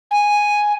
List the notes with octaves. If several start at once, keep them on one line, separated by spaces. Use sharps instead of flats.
G#5